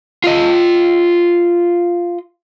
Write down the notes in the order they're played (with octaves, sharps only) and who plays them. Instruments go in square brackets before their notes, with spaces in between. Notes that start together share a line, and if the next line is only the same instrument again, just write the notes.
[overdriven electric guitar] F4 D#5